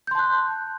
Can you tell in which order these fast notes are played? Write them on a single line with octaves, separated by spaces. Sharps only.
G6 C6 A5 F#6